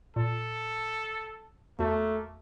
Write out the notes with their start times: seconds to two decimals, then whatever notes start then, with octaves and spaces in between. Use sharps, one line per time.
0.16 A#2 A4
1.79 E2 A3 A#3 F#4